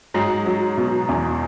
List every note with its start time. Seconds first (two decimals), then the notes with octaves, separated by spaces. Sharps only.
0.14 G#2 F#3 G#3
0.46 F#3
0.77 B2
1.09 E2